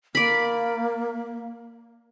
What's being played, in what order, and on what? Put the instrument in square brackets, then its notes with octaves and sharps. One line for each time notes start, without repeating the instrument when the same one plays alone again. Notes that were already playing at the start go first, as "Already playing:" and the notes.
[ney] A#3 [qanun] D5 B5